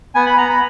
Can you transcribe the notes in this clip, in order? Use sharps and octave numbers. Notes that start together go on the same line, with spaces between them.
B3 G#5
B5
B3 A#5
B5